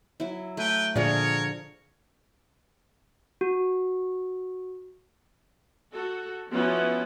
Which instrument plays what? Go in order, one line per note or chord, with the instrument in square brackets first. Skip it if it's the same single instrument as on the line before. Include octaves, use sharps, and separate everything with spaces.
[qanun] F#3 E4
[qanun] A3 [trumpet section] B4 G5
[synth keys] A#2 D5 [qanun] D3 F3 G#4 [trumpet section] A#4 C#5
[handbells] F#4
[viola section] F#4 A4
F3 B3 C#4 E4 F#4